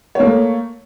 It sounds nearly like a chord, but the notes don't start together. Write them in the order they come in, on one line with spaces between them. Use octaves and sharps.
C#5 A#3 A3